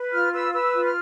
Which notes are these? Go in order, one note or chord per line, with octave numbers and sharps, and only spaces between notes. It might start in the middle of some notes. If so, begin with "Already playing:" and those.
Already playing: B4
F4 F6
B4 E6
B4 E6
F4
F6